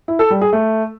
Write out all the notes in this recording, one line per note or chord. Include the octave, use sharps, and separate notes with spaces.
E4
A4
G3
G#4
A3